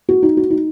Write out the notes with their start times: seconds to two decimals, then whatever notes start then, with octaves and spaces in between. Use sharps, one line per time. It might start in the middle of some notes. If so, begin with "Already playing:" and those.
0.09 F#4
0.23 D#4
0.37 F#4
0.50 D#4